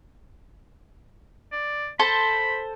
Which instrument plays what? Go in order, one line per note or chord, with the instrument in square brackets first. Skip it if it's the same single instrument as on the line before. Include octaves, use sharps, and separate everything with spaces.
[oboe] D5
[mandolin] A4 C5 A5 [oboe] B5